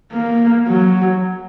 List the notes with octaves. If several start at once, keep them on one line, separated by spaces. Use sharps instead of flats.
A#3
F#3